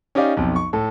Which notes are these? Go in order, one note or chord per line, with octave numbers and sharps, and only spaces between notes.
C#4 D#4 G4 D5 F5
B1 F2
C#6
A2 A4